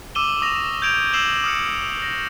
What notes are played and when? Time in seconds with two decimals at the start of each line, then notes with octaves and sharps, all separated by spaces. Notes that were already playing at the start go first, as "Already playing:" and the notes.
0.15 D6 E6 D#7 E7 G7
0.41 C#6 D#6 A#6 F7
0.82 G6 G#6 D7 F7
1.13 E6 C7 E7 F#7 G7
1.44 D#6 F6 C#7
2.02 A#6